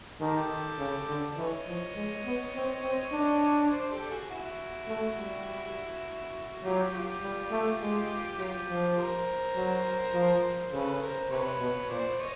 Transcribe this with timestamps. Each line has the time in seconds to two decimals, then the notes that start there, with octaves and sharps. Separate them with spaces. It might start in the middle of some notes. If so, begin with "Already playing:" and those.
0.20 D#3 G4 A4
0.79 C#3
1.08 D3
1.37 E3 C#5 D#5
1.67 F3
1.96 G#3
2.25 B3
2.55 C4
2.83 C4
3.12 D4
3.71 C5 D5
3.91 G4 A4
4.10 F#4 G#4
4.30 E4 F#4
4.88 A3
5.18 G3
6.63 F#3 F4 G4
6.93 F4 G4
7.22 G3
7.51 A3
7.81 G#3
8.38 F#3 F4 G4
8.69 F3
8.97 A#4 C5
9.56 F#3
10.14 F3
10.72 C#3 A4 B4
11.02 A#4 C5
11.31 C3 B4 C#5
11.60 B2
11.89 A#2 C5 D5
12.19 C#5 D#5